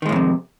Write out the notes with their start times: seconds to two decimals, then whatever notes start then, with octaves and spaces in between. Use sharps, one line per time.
0.02 D#3
0.06 G#3
0.09 A2
0.12 F2
0.16 C3